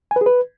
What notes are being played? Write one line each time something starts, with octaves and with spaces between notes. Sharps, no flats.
G#5
B4
G#4
B4